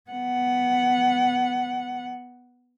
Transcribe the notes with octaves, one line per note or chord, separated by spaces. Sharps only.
B3 F#5